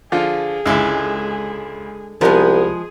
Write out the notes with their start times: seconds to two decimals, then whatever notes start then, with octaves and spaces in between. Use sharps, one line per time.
0.12 D3 F3 F4 G#4
0.66 C#2 D3 G#3 E4
2.21 C2 F3 G#3 B3 G#4 A#4 B4